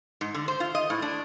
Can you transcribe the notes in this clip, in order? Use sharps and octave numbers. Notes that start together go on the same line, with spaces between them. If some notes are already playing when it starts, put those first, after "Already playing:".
G#2
D3
C5
F4
D#5
A2
D4